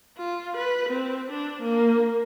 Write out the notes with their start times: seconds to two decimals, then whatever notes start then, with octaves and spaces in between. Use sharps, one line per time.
0.18 F4
0.57 B4
0.89 C4
1.30 D4
1.62 A#3